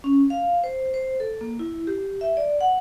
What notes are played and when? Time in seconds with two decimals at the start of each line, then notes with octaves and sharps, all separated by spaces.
0.04 C#4
0.30 F5
0.64 C5
0.94 C5
1.20 A4
1.41 A#3
1.59 E4
1.87 G4
2.21 E5
2.37 D5
2.61 F#5